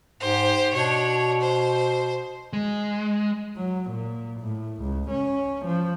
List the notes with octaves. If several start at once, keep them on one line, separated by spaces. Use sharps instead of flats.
G#2 G4 C5
B2 D4 C#5
C5
G#3
F#3
A#2
A2
C#2
C#4
F3